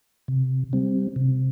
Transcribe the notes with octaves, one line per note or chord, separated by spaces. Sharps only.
C3
G3 C4
C3